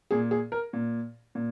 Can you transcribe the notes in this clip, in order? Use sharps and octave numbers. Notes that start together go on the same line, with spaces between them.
A#2 G#4
G#4
A#4
A#2
A#2